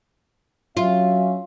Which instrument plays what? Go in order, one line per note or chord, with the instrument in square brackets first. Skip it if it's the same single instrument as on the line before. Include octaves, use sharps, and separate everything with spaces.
[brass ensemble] F#3 C#4 E5 [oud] F4